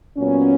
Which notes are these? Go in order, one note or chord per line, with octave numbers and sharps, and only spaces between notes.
A#2 F#3 B3 C#4